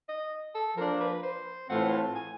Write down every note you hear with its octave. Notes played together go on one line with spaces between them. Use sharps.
D#5
A4
F3 A#3 D4 A#4
B4
C5
A2 E3 A3 C4 F4 F#5
A5
G#5